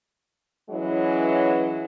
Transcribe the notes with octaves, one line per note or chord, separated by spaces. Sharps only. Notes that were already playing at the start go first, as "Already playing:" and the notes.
E3 F#3 G#3 C#4 E4